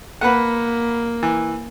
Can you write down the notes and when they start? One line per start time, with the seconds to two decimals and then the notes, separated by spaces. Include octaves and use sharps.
0.21 A#3 B4 F#5
1.23 E3